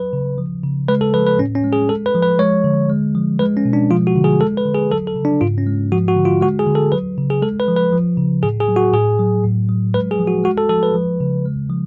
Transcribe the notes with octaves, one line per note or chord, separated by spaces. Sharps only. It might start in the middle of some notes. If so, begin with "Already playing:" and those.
Already playing: F#3 B4
C#3
F3
C#3
G#3 B4
A4
F3 B4
B4
A2 C#4
C#4
G#3
G#4
G#3 A4
B4
F3
B4
G#3 C#5
D3
G#3
F3
G#3 B4
C#4
B2
D4
F3 F4
F#4
D3
G#4
G#3 A4
B4
D3
G#4
F#3 A4
A4
C#3
D4
G#2 F4
C#4
G#3
F3 F#4
F#4
D3
F4
G#3 F#4
G#4
D3
A4
F#3 B4
C#3
G#4
G#3 A4
B4
F3
B4
F3
C#3
A2 G#4
G#4
F#3
F#4
A2 G#4
F#3
A2
F#3
G#3 B4
G#4
F3
F#4
G#3 F#4
A4
F3 A4
B4
F3
C#3
G#3
F3